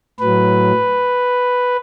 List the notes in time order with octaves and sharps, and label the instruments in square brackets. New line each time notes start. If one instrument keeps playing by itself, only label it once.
[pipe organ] A2 F#3 B4